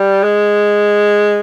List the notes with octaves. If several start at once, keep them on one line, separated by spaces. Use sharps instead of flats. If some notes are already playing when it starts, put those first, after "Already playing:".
Already playing: G3
G#3